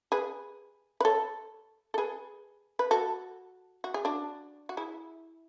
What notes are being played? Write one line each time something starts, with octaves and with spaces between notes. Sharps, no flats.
G#4 B4
B4
A4 C#5
A4
G#4 B4
B4
F#4 A4
F#4
G#4
D4 F#4
F#4
E4 G#4